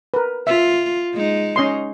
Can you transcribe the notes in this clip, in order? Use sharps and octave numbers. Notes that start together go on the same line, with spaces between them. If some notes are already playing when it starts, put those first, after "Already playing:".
A#4 B4
F4 E5
G#3 D#4
C#4 D#5 C6